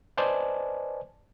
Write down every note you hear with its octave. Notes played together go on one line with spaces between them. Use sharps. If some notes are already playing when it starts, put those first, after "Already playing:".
B4 C5 D5 D#5 G#5 A5